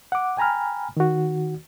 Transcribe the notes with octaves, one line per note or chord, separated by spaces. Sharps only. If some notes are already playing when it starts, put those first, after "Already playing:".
F#5 D6
G5 G#5 A#5 B5 F6
D#3 F#4